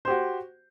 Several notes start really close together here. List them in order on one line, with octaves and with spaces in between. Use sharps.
C5 G4 F#4